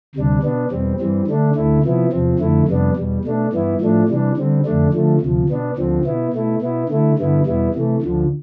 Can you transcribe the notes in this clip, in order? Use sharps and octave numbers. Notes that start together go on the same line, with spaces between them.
D2 C3 G3 D4
B2 B3 D4
E2 B2 G3 C4
G2 E3 G3 C4
D3 A3 D4
D2 D3 A3 E4
C3 F3 B3 E4
E2 C3 F3 C4
F2 D3 A3 E4
F2 C3 G3 B3 D4
E2 B2 G3
B2 A3 D4
G2 E3 B3 E4
A2 F3 A3 D4
C3 E3 G3 D4
D3 G3 C4
F2 D3 A3 D4
D3 F3 A3
D2 C3 F3
B2 B3 D4
D2 D3 F3 C4
B2 B3 E4
B2 A3 E4
B2 B3 E4
D3 A3 E4
G2 D3 G3 B3 E4
E2 B2 G3 B3 E4
C3 E3 A3
D2 D3 F3